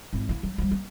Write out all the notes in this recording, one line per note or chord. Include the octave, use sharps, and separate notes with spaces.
G#1 E4
A#3 E4
F#3
F3 G3
A#3